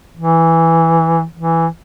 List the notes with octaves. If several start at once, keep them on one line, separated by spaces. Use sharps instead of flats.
E3
E3